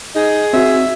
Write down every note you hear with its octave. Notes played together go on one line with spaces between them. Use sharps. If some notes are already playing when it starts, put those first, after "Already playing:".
D#4 G#4
C4 F#4 E5